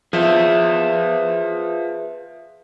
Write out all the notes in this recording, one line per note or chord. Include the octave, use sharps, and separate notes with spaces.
F3 G#4 B4 E5